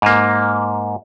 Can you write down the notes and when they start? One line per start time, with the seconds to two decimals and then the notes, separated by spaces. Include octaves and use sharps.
0.02 G#2 A#3